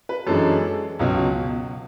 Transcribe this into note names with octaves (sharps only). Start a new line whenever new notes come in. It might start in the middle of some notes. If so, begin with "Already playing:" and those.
B4
F#2 E3 G#3 D4 A4
C#2 B2 F#3